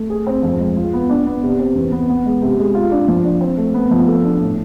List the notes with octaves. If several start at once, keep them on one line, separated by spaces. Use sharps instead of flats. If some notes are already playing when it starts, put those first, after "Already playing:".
Already playing: A3
G#4
C4
F2
G#3
F4
B3
D4
B3
C3
C4
E2
B3
B3
G#3
C3
G#3
F4
D4
F3
D4
C4
A3
B3
F3
A4
D4
A2